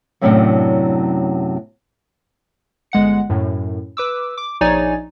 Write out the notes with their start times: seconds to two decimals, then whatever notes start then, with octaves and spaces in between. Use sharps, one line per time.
0.21 F#2 A2 C3 F#3 C#4 D4
2.92 G1 G#3 F#5 C#7
3.30 F#2 A2
3.97 B4 D6 E6
4.38 D6
4.61 A#1 D#4 C#5 D5 G#5 A6